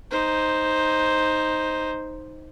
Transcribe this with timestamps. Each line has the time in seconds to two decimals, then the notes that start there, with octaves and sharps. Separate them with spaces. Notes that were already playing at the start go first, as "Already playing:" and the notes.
0.11 D#4 C5